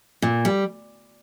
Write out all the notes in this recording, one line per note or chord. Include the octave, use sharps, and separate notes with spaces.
A#2
G3